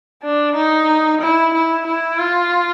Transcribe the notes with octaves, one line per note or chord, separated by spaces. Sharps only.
D4
D#4
E4
E4
E4
F4